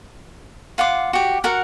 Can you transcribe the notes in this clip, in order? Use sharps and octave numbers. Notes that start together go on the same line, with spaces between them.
F4 F#5 C6 D6
F#4 G4
F#4 A#4 F#5